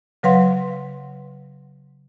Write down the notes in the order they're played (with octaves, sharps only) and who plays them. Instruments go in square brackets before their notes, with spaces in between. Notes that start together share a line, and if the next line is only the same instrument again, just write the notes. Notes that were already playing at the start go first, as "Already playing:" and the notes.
[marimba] C#3 F#3 B4 F5 F#5 C6